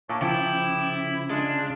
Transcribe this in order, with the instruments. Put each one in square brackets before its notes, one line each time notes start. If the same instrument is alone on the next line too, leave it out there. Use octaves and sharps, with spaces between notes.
[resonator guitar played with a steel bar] A#2 [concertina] C#5 A5 D6
[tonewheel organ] C#3 [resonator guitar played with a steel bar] F3 [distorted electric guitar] E4 [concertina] G5 D6
[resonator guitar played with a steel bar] G#3 [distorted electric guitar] D4 [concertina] F4